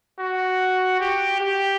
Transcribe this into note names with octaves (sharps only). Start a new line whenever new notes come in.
F#4
G4
G4